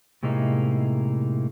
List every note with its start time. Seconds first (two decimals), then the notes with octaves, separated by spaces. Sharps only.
0.23 A2 C3 G#3 A#3 D#4 E4